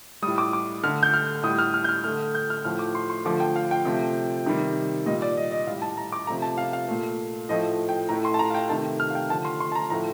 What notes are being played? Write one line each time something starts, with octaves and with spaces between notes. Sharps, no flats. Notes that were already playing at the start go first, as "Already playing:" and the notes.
A2 G3 D#6
D6
D6
D3 A3 F6
G6
F6
A2 G3 D#6
F6
F6
G6
F6
D3 A3 F6
G6
F6
A2 F3 A3 F6
D6
C6
C6
D3 F3 A3 D6
G5
F5
G5
C3 F3 A3
C3 D#3 G3
A#2 G3 D#5
D5
D#5
D#5
A2 G3 F5
A5
A#5
D6
C3 F3 A3 A#5
A5
F5
F5
A#2 A3
A2 F3 A3 D#5
G5
A2 A3 A#5
C6
A5
A#5
F5
G5
C3 D#3 A3 A5
F6
F5
G5
D3 F3 A3 A5
C6
C6
A5
A#5
A2 F3 A3 A#5